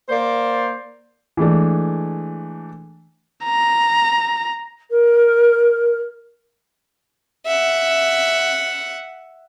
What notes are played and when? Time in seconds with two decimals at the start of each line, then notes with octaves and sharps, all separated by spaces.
0.09 A#3 C5 D5
1.37 E3 G#3 A3 D4
3.44 A#5
4.91 A#4
7.46 E5 F#5